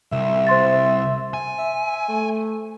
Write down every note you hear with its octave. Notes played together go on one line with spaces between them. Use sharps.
C2 E5
C5 C6 A6
G#5
E5
A3